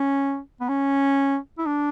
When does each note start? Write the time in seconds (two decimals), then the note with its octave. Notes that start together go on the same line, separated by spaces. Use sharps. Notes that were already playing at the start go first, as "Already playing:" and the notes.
Already playing: C#4
0.60 B3
0.69 C#4
1.58 E4
1.66 D4